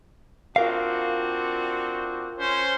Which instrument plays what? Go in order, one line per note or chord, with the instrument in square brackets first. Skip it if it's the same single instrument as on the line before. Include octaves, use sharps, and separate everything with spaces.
[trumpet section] C4 D4 F#4 [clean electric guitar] F4 A#4 F5
[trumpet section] C#4 C5